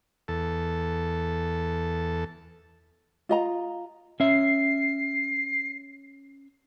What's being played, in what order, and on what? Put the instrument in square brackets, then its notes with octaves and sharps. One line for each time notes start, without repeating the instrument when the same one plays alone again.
[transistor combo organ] E2 A4
[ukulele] F4 D#5 A#5
[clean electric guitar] C#4 E5 [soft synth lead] C7